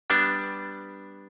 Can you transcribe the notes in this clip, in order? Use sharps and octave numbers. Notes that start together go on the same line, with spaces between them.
G3 B3 D4